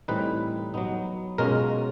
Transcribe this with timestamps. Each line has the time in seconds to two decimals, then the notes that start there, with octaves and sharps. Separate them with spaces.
0.08 A2 E3 G3 C4 D#4 B4
0.74 F#3 B3 D#4
1.38 B2 G#3 C#4 F4 A#4